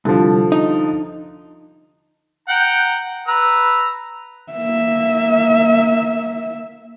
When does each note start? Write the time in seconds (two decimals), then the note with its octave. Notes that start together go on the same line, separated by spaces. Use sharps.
0.05 C2 D3 F3
0.52 D#4
2.48 F#5 G5 A#5
3.27 B4 A#5 E6
4.53 A#3 E5